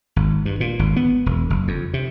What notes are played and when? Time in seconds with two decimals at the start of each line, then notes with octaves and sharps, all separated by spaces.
0.16 G#1
0.45 G2
0.61 A#2
0.79 G#1
0.96 B3
1.26 E1
1.50 F#1
1.68 F2
1.94 C3